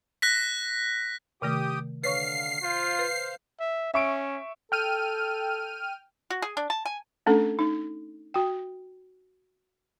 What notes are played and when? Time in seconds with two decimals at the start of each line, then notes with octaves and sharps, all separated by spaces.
0.22 F#6 A#6 B6
1.42 C3 D#3 A3 G4 G5 D#6
2.03 D3 B4 C#5 F5 C#6 C7
2.63 F4 C5 F5
2.99 B4
3.60 E5
3.94 C#4 E5 C#6 D7
4.72 A4 G5 F6 D#7
6.30 F#4
6.42 G#4
6.57 D4
6.70 A5
6.85 G#5
7.26 A3 C#4 D4 A4
7.59 D#4
8.34 F#4 G5